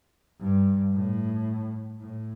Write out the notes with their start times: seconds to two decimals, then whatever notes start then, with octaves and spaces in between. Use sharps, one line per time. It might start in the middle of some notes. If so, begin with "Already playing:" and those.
0.40 G2
0.93 A2
2.00 A2